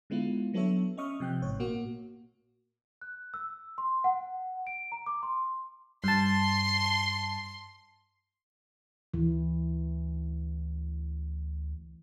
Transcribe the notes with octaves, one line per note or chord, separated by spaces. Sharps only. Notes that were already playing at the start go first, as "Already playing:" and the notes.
D3 G#3 B3 E4 F4
F#3 B3 D4 A4 C#5 E5
C#4 D#5 E5 C#6 D#6 F6
C3 F3 G5 F#6 G6
A1 G#2 C#5
A#2 A#3 F#4
F#6
E6
C6
F#5
D7
A#5
D6
C6
G2 A5 C6
D2 E3